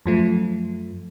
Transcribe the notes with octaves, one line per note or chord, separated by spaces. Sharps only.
F#2 F3 A3